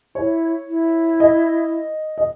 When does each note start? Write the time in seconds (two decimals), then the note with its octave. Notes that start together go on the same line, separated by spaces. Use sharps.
0.15 E4 C#5
0.68 E4
1.20 D#5
2.18 D#5